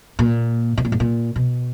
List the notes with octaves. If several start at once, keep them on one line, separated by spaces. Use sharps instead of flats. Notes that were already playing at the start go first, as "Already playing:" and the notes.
A#2
B2
A#2
G#2
A#2
B2